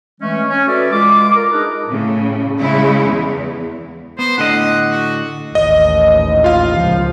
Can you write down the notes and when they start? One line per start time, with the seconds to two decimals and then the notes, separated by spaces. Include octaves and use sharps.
0.21 E3 G#3 A3 C#4
0.49 C#4
0.67 F#4 A4 B4 D5 E5
0.92 G#3 F4 D6
1.35 A#4
1.51 D4 D#4 G#4 B4 D#5
1.88 A2 C#3
2.58 C#3 G#3 E4
3.08 E2
4.19 B3 C5
4.38 A2 D3 D#5 F#5
4.91 F#4
5.55 A1 D#2 D#5
6.44 F4 F5
6.75 C#2 F3